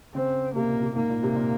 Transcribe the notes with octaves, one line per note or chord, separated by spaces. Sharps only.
C#3 C4
C3 A#3
A#2
C3
G#2 A#3
A#2
C3
A#2